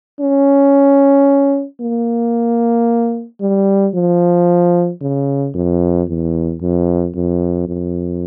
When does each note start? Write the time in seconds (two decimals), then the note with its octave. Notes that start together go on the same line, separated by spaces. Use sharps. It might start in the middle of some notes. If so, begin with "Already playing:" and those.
0.20 C#4
1.81 A#3
3.41 G3
3.95 F3
5.01 C#3
5.55 F2
6.08 E2
6.61 F2
7.15 F2
7.68 F2